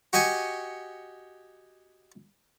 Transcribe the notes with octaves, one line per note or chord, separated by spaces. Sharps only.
F#4 G4 D#5 G#5 C#6